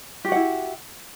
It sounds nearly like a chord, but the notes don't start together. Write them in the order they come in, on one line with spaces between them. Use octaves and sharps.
G4 F#4 F#5 E4